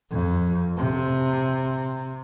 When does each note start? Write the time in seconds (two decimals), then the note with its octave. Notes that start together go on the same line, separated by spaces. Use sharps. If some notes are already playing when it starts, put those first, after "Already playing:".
0.12 F2
0.78 C3